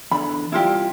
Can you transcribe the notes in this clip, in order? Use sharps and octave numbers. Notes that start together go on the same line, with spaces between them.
E2 D3 B5
C3 G3 E4 F4 G4